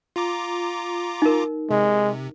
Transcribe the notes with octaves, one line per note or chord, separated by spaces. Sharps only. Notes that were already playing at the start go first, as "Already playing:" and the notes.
F4 A#5 D6
D#4 A#4
C3 G#3